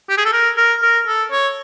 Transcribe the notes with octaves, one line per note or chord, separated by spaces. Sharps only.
G4
G#4
A4
A#4
A#4
A#4
A4
C#5